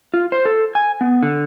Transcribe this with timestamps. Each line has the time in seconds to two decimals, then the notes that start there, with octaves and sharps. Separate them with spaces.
0.14 F4
0.32 C5
0.45 A4
0.75 G#5
1.01 B3
1.23 D3